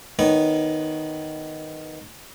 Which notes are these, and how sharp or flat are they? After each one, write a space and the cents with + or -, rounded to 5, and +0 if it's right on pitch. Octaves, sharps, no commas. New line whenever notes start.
D#3 +0 B3 +0 C#5 +20